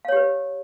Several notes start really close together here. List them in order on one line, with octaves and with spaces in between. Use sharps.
F5 C#5 G4 B4